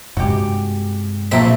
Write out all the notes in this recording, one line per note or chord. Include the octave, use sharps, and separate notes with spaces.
G2 C3 G#3 F#4 G4
A#1 A3 A#3 C4 E5